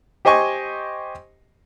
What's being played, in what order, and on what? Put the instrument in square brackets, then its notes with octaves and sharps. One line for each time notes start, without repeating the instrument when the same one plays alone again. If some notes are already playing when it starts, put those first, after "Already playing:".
[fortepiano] G4 C5 D#5 G#5 C#6